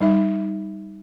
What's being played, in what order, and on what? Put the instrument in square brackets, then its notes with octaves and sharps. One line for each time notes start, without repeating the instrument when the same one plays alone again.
[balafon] G3 D#4 E5